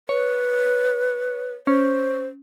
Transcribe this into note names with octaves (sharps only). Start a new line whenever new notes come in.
B4 C#5
C#4 C5